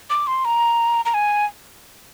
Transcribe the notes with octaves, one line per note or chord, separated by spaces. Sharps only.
D6
C6
A#5
A#5
G#5